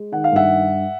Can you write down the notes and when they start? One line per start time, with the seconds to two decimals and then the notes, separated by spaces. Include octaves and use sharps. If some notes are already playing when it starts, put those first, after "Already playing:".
Already playing: G#3
0.12 D#3 F#5
0.24 F5
0.32 G2 E5 F#5